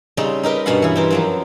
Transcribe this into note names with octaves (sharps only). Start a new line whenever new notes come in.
C#3 G3 C4 C#4 D#4
D#4 G4 A#4 B4
G2 B2 C#4 F5 F#5
E3 E4
C4 G4 A#4
F#2 F3 F#3